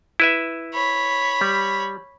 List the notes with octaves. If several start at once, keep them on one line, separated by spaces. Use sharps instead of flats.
E4 B4 E5
C#5 B5
G3